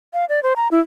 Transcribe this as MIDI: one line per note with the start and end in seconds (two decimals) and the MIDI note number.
0.13 0.25 77
0.29 0.42 74
0.43 0.53 72
0.56 0.68 82
0.71 0.80 64